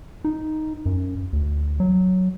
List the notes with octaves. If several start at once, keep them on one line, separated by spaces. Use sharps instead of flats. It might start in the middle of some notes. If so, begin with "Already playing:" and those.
D#4
F#2
D2
F#3